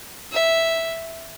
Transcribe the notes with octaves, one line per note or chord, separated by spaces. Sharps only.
E5